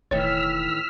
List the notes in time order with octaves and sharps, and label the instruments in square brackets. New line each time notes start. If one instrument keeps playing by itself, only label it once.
[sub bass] E1 [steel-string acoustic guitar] A2 D#3 E3 [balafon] C#5 [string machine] E6 F6 B6